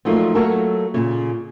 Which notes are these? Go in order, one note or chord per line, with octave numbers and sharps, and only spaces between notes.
F3 F#3 A3 A#3 D#4 F4
F#3 A3 A#3 F#4 A4 A#4
A#2 C#3